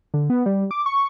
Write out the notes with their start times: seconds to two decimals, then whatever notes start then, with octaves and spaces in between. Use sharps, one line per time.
0.14 D3
0.30 B3
0.46 G3
0.71 D6
0.86 C#6